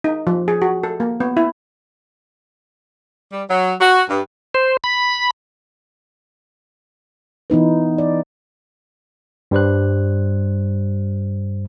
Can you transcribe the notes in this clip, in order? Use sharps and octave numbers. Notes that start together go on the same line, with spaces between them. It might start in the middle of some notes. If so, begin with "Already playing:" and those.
D#4
F3
G#4
F#4
A4
A#3
B3
E4
G3
F#3
F#4
G2
C5
B5
E3 B3 D#4 B4
D5
G2 G3 C5 F#6